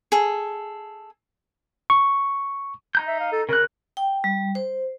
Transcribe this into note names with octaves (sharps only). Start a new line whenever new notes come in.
G#4 A4
C#6
D#4 A#5 G6
E5
F5
A4
C#3 A#4 F#6
G5
G3
C5